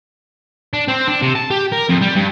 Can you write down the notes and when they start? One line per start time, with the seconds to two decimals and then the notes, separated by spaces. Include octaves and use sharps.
0.73 D4
0.88 C4
1.07 D4
1.22 C3
1.35 A5
1.50 G4
1.72 A#4
1.89 F2
2.02 G3
2.16 G2